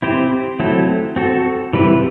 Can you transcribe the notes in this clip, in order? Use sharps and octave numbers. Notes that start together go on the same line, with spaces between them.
C4 E4 G4 C5
F#3 A3 C4 E4 A4
C4 F#4 A4
E3 G3 C4 E4 B4